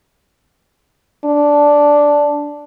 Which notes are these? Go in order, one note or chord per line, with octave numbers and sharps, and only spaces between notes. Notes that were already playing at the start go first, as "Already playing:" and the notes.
D4